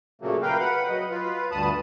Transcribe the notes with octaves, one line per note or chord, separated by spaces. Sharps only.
A#2 C#3 F#3 A3 A#3
A#4 B4 F5 G5
B4 F#5 B5
F#3 D#5
F4 B4
D2 G2 A5 B5 D#6